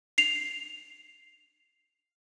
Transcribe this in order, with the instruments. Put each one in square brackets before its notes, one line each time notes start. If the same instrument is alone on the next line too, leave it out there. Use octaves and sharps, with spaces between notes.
[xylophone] C7 F7